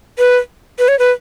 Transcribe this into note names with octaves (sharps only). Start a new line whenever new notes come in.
B4
B4
C#5
B4